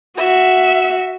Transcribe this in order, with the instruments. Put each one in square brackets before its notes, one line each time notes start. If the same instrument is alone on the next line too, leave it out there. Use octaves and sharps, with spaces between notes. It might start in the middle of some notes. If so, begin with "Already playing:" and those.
[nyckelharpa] F#4 [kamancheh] E5